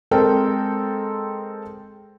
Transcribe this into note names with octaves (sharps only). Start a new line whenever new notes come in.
G#3 C4 A4 A#4 G5